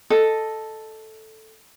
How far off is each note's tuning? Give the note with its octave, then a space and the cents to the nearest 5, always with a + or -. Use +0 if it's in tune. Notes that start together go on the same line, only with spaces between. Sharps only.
A4 +0 D#5 +0